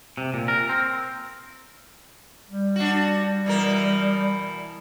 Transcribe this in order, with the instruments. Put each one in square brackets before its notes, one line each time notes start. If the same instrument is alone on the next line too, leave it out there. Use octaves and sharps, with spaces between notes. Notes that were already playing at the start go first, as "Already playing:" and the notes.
[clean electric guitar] C3
A#2
A#4
C4
[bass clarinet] G3
[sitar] D4 F#4
B2 E3 A#4